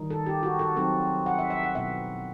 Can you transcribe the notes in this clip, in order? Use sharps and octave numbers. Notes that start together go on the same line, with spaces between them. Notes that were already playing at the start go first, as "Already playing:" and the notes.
Already playing: D#3 G3 D#4
A4
G4
F#4
A4
F#3 C4 D#4 A4
F#5
E5
E5
F#5
B2 F#3 B3 E4 E5